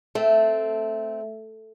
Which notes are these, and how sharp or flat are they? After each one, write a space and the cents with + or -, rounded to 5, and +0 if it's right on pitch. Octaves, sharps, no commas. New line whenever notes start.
A3 +0 C4 -5